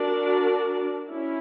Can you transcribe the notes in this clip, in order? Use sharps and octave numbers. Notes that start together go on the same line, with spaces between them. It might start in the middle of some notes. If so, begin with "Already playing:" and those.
Already playing: D4 F#4 A#4 D5
C#4 E4